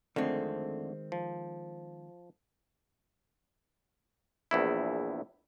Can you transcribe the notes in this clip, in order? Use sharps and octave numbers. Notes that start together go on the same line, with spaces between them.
F2 D3 D#3 G#3 A3 C4
F3
A#1 E2 E4